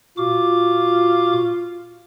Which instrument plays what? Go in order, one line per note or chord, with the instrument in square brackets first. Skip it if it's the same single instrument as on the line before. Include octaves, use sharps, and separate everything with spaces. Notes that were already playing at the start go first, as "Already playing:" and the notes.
[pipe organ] A#2 F#4 D6 [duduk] F4